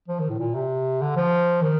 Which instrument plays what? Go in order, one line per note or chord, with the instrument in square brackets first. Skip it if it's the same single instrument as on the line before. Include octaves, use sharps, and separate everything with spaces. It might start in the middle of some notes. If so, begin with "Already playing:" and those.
[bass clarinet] F3
D#3
A2
A#2
C3
D3
F3
D#3